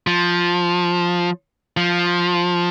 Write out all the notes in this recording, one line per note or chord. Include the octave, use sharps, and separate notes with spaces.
F3
F3